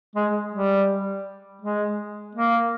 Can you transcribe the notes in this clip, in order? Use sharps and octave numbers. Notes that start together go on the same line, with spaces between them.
G#3
G3
G#3
A#3